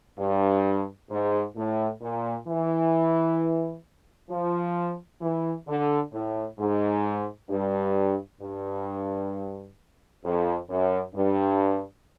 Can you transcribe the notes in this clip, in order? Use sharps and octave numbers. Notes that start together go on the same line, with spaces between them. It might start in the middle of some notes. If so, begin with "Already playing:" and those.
G2
G#2
A2
A#2
E3
F3
E3
D3
A2
G#2
G2
G2
F2
F#2
G2